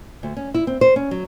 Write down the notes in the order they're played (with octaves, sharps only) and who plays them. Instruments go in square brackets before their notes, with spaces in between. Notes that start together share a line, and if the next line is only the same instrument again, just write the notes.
[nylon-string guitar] D2
C#4
E4
C4
C5
C#4
F#3